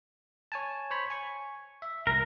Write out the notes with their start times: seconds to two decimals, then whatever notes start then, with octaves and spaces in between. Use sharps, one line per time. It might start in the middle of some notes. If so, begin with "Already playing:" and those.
0.52 C#5 G#5 A5
0.91 C5 C#5 B5
1.10 G#5 C#6
1.82 E5
2.07 C2 A#4